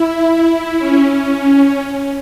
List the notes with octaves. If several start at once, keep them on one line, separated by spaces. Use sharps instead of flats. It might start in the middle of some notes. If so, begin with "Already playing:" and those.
Already playing: E4
E4
C#4